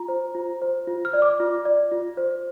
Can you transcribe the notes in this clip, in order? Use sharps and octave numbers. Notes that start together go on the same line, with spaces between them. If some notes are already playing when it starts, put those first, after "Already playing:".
Already playing: F4 A#5
C5
F4
C5
F4
F6
D5
D6
F4
D5
F4
C5